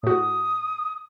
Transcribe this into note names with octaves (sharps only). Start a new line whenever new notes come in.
A2 F#4 D#6